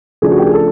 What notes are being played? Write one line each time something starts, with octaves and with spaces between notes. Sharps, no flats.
C#3 F3 A3 D4 G#4
F#4
G4
G#4
A4